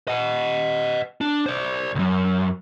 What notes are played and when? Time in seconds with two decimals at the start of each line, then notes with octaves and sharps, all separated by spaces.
0.08 D#5 F#5
1.21 D4
1.46 C5 D5
1.95 C2 F#2